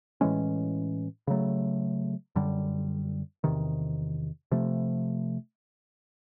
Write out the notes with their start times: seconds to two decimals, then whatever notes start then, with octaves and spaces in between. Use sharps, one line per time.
0.21 A2 E3 G#3 C#4
1.27 C#3 F#3 A3
2.36 F#2 D3 G3
3.44 E2 C3 D#3
4.52 C3 F3 A3